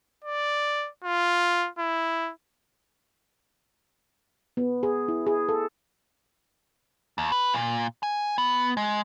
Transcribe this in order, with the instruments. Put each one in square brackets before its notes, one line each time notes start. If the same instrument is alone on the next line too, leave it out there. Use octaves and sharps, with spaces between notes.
[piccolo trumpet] D5
F4
E4
[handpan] B3
G#4
E4
G#4
A4
[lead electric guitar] D#2
B4
A#2
G#5
B3
G#3